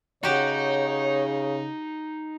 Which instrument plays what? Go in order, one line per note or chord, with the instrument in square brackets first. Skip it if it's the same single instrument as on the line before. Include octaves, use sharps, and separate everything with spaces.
[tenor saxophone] C#3 [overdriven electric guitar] D#4 [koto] F#4 G4 [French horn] C#5